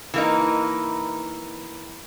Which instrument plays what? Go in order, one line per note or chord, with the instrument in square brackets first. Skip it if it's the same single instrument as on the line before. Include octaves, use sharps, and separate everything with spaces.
[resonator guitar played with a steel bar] E3 A#3 D#4